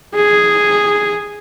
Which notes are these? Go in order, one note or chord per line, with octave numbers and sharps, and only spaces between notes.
G#4